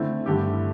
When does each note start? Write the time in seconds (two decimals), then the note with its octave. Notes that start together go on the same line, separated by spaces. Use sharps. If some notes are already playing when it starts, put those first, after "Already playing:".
Already playing: D3 A3 C4 E4
0.26 G2 D3 A3 E4 G4